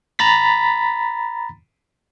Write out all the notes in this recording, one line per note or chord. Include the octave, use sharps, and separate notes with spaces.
A#5 B5 A6 B6